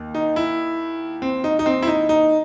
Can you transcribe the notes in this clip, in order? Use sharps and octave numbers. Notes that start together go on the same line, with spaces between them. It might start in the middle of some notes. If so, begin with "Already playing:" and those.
Already playing: D#2 D#3
D#4
E4
C4
D#4
D#4
C4
E4
D#4
D#4